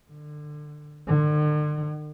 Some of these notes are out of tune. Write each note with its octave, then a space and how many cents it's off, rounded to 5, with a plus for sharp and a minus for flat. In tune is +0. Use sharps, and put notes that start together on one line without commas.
D3 +25
D3 +40